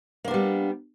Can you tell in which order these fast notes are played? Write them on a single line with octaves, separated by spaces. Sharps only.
A#3 D4 B3 G3